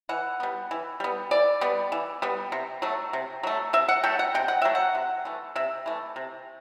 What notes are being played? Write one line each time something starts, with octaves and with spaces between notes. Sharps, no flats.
E3 F#5
G3 B3
E3
G3 B3
E3 D5
G3 B3
E3
G3 B3
C3
F#3 A3
C3
F#3 A3
C3 E5
F#5
F#3 A3 G5
F#5
C3 G5
F#5
F#3 A3 E5
F#5
C3
E3 A3
C3 E5
E3 A3
C3